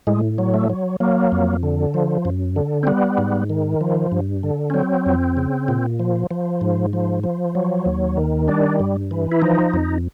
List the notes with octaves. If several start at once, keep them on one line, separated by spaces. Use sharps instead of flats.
A2 G#3
F#3
A3
F#3
F#3 A#3
F2
D3
F3
F#2
D3
C4
G3 B3
G#2
D#3
F3
G2
D3
C#4
F#3 C4
F2
C#3
A#2
F3
F3
G#2
F3
F3
F#3
D#2
D#3
G3 D4
G2
E3
E4
F3 D#4
F2